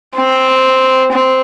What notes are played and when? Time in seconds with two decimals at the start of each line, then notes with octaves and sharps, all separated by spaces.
0.16 C4
1.12 C4